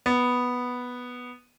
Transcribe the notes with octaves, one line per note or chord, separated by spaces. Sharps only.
B3